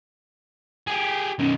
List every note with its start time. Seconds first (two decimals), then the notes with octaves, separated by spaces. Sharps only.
0.87 G4 G#4
1.39 B1 D#3 C#4